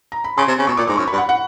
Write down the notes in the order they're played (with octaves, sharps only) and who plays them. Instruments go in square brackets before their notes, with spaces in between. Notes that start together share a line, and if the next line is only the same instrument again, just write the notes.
[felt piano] A#5
B5
[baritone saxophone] C#3 [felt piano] C6
[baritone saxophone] C3
C#3
[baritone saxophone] B2 [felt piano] C#6
[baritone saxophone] A#2 [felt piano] D6
[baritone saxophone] G#2 [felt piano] D6
[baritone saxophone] F#2 [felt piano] C#6
[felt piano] B5
[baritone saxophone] G2
[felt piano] F#5
F#5